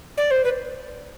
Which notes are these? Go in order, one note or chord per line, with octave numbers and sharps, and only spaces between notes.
D5
C5
B4